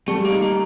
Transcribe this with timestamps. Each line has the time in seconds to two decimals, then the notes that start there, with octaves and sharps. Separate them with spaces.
0.08 G3 A3
0.25 A#3
0.31 D#4
0.42 A#3